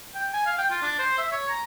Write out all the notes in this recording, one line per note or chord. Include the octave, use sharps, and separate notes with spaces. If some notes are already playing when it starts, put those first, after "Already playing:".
G5
G#5
F5
G5
F4
D4
C5
E5
C#5
A#5